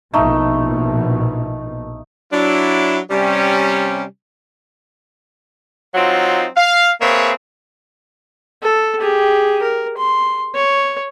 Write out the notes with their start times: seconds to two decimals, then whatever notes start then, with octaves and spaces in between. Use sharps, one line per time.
0.14 A#1 B2 A3 D#4
2.32 F#3 D4 E4
3.11 C3 G3 C#4
5.95 F#3 C4 D#4 F4
6.56 F5
7.01 A#3 C4 G#4 B4 C#5 E5
8.63 A4
8.99 G4 G#4
9.63 A#4
9.98 C6
10.55 C#5